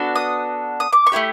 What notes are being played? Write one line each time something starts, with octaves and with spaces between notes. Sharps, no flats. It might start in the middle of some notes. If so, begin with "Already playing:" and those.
Already playing: B3 D4 F#4 A4
D#6
D#6
D6
C#6
A3 C4 E4 G4